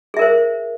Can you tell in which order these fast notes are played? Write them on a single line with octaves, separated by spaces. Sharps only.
G#4 E5 A#4 C5